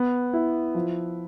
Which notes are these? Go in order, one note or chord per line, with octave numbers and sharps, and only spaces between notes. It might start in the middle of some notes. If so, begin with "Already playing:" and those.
Already playing: B3
E4
F3